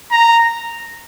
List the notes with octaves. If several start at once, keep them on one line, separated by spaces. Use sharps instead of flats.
A#5